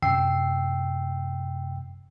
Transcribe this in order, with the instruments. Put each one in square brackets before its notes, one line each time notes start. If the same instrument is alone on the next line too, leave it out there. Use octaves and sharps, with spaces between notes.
[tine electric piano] F#2 C3 G5 E6 C7